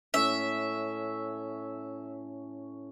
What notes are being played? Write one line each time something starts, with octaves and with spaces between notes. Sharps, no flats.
A2 C#4 E5